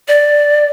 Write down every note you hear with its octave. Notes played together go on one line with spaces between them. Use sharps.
D5